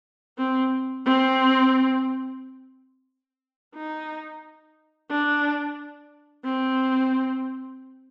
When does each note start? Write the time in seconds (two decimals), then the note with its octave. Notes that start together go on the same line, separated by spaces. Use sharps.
0.38 C4
1.06 C4
3.75 D#4
5.10 D4
6.45 C4